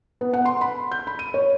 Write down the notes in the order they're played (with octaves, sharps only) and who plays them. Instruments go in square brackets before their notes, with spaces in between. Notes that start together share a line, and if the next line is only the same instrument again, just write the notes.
[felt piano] B3
F#5
C6
B5
G6
B5
D#7
C#5